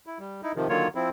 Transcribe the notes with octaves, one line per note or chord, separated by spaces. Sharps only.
E4
G3
D#4 E4
C3 D#3 F3
D3 D#3 F#3 A#3 F4 C#5
F3 C4 E4